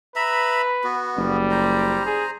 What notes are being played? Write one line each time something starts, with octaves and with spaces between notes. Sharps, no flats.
B4 E5 A#5 B5
B3 F#4
F#1 G3
C5 A#5
G#4